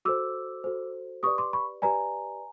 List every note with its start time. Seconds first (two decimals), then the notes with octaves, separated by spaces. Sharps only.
0.05 F#4 A4 C5 D6 E6
0.64 F#4 A4 C5
1.23 G4 B4 D5 C#6 D#6
1.38 C6 D6
1.53 B5 C#6
1.82 G4 B4 D5 G#5 A#5